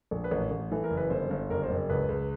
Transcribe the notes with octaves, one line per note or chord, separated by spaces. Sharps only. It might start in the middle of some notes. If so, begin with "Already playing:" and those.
A#1
B4
A1 A#4
A1
E3 A4
A#4
F#1
B4
G1 C5
G1
F#1 A#4
C5
F#1
C#2 B4
C#2